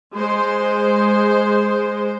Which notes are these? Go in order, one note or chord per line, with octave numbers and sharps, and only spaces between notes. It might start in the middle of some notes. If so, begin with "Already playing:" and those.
G#3 C5